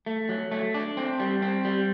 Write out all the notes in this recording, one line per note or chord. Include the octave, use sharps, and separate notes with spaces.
A3
F#3
A3
D4
C4
G3
C4
G3